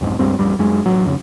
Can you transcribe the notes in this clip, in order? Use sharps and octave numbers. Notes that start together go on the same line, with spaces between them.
B1 F2 G#2
C#2 G2 G3 C4
A1 F2 G3
F#2 G#3
A1 F#3
F2 C#3